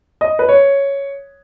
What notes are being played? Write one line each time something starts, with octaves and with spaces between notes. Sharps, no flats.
D#5
B4
C#5